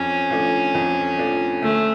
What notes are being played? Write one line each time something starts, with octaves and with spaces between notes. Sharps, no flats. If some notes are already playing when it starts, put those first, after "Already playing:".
Already playing: F2 C#4
F3 A3 D4
F2
F3 A3 D4
D2 A3